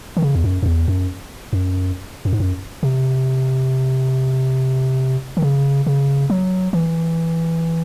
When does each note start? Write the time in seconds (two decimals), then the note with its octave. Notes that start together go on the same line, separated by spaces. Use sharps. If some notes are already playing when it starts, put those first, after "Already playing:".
0.17 D#3
0.22 C#3
0.35 E2
0.44 F#2
0.63 F#2
0.66 E2
0.88 F#2
1.53 F#2
2.25 F#2
2.32 G#2
2.40 F#2
2.83 C3
5.37 D#3
5.42 C#3
5.87 C#3
6.30 F#3
6.73 E3